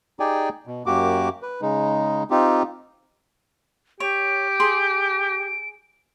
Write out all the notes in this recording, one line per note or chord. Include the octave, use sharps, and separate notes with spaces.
D#4 G4 G#4 D5 G5 G#5
B2
F#2 A#3 F#4 G4 D6
B4
C#3 G#3 D#4
C4 D#4 F4 G4
G4 C#5 D7
G#4 C6 D#6